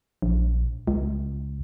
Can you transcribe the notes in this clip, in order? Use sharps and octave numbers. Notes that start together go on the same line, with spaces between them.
A#1
C#2